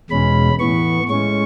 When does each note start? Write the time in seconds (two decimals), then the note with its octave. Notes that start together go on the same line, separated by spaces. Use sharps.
0.10 E2 B2 G#3 C#4 B5
0.59 A2 E3 B3 C#6
1.09 A2 G#3 C#4 C#6